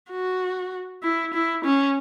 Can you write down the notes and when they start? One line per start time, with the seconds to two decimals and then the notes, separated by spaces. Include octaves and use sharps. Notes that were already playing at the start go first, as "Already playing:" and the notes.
0.10 F#4
1.03 E4
1.34 E4
1.64 C#4